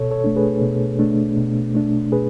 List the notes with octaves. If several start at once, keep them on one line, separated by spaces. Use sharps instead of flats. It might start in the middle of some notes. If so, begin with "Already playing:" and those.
Already playing: B2 A4 C#5
A4 C#5
A3 D4
G#4 B4
B2
A3 D4
B2
A3 D4
B2 G#4 B4